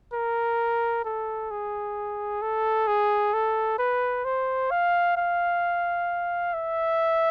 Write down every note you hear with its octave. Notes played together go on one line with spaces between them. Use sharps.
A#4
A4
G#4
A4
G#4
A4
B4
C5
F5
F5
E5